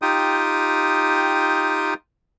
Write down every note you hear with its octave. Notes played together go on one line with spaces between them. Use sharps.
D#4 F4 G4 G5 D#6